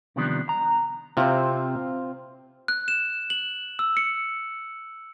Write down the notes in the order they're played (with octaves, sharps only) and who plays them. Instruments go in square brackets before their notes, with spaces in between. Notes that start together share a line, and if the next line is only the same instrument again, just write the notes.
[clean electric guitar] C3 D#3 F3 G3 B3 D4
A#5
[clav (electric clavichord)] C3 [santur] C4 F4
[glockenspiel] F#6
E7
F#7
E6
C#7